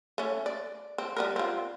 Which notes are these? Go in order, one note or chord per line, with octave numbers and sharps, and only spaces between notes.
A3 C#4
D5
C4
G3 B3 A#4
C4 F4